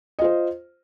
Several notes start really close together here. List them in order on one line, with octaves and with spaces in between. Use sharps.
D#5 F4 C5